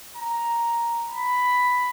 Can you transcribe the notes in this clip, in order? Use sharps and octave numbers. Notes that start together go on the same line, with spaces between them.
A#5
B5